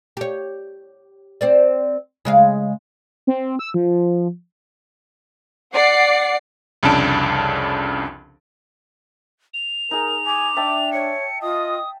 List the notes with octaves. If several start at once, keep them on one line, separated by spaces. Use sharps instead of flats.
G4 C#5
C4 C5 D5
C#3 G#3 F5
C4
E6
F3
D5 F#5 C7
C2 F2 C#3 D4 A5 D7
F7
D#4 G#4 A#4
G#5 D6
D4 E5 G5 A5
C#5 C#7
F4 D#5 D#6